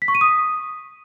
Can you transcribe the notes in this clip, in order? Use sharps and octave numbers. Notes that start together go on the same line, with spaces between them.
B6
C#6
D#7
D#6